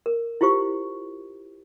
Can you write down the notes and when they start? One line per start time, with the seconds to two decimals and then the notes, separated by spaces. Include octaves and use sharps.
0.06 A#4
0.41 E4 F4 G4 C5 C#6